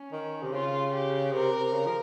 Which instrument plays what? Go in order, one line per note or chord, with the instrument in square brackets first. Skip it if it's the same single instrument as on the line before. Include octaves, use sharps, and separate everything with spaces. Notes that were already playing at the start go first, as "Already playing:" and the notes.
Already playing: [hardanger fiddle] C#4
[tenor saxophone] D#3
C3
[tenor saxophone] C#3 [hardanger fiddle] F4
[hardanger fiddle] G4
[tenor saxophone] C3 [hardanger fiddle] A#4
[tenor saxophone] C3
C#3
F3